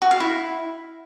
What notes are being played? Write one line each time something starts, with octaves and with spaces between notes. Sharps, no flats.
F#4
F5
E4